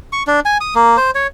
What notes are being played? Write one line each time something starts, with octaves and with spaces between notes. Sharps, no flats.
C#6
D4
G#5
D#6
A#3
C5
C#5